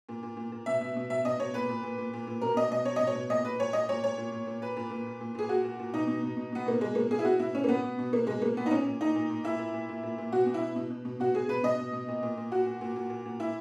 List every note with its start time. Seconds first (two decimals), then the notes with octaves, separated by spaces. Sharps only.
0.09 A#2
0.23 A#2
0.37 A#2
0.52 A#2
0.66 B2 E5
0.81 B2
0.96 B2
1.10 B2 E5
1.25 B2 D#5
1.39 B2 C#5
1.54 A#2 B4
1.69 A#2
1.83 A#2
1.98 A#2
2.13 A#2
2.27 A#2
2.41 B2 A#4
2.57 B2 D#5
2.71 B2 D#5
2.85 B2 C#5
2.96 B2 D#5
3.07 C#5
3.15 B2
3.30 A#2 D#5
3.45 A#2 B4
3.59 A#2 C#5
3.73 A#2 D#5
3.89 A#2 C#5
4.03 A#2 C#5
4.18 A#2
4.32 A#2
4.47 A#2
4.61 A#2 B4
4.77 A#2
4.91 A#2
5.06 A#2
5.21 A#2
5.35 A#2 G#4
5.49 A#2 F#4
5.64 A#2
5.79 A#2
5.94 B2 D#4
6.08 B2
6.23 B2
6.37 B2
6.52 B2 B3
6.66 B2 A#3
6.81 B2 G#3
6.95 B2 A#3
7.11 B2 G#4
7.19 E4
7.25 B2 F#4
7.39 B2 E4
7.54 B2 C#4
7.64 A#3
7.68 B2 B3
7.84 B2
7.99 B2
8.13 B2 A#3
8.27 B2 G#3
8.42 B2 A#3
8.57 A#2 B3
8.66 D#4
8.71 A#2 C#4
8.86 A#2
9.01 A#2 D#4
9.15 A#2
9.30 A#2
9.44 A#2 E4
9.59 A#2
9.74 A#2
9.89 A#2
10.03 A#2
10.18 A#2
10.32 B2 F#4
10.46 B2
10.54 E4
10.61 B2
10.76 B2
10.90 B2
11.05 B2
11.20 B2 F#4
11.34 B2 G#4
11.49 B2 B4
11.63 B2 D#5
11.79 B2
11.93 B2
12.08 A#2
12.22 A#2
12.37 A#2
12.51 A#2 F#4
12.66 A#2
12.81 A#2
12.96 A#2
13.10 A#2
13.25 A#2
13.39 A#2 E4